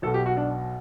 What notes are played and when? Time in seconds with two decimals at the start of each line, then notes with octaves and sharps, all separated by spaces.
0.02 B1 A4
0.07 B2
0.14 G4
0.26 F#4
0.37 D4